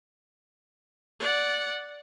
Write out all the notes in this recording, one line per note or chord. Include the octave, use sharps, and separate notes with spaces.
D5 F#5